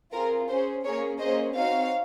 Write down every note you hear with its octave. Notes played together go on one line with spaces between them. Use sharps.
C4 F4 G#4 A#4
C#4 G#4 C5
A#3 C#4 G#4 A#4 C#5
A#3 C#4 G#4 C5 D#5
C4 D#4 F#4 C#5 F5